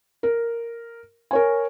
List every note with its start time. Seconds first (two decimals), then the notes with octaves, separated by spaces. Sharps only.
0.23 A#4
1.31 A#4 C#5 G#5